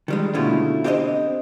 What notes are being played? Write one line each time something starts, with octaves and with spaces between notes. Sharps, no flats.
D#3 G3 G#3
B2 D3 A3 C#4 E4 F4
C4 D4 G4 C5 D5 D#5